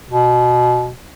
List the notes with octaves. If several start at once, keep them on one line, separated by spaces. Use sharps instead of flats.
B2